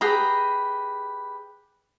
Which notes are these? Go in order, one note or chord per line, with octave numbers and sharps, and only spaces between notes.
G4 G#4 B4 A#5